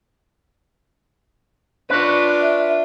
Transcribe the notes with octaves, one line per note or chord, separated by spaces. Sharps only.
D4 F4 B4 C#5
E5